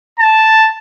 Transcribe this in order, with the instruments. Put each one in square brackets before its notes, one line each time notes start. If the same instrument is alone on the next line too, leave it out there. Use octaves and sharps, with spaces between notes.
[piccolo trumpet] A5